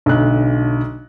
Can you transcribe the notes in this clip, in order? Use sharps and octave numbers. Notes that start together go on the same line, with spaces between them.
B1 D3 A3 F#6